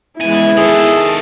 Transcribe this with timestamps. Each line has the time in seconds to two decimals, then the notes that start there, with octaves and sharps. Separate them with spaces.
0.20 C#3 E3 G#3 B3 E4 G#5
0.57 D#3 G#4 A4 A5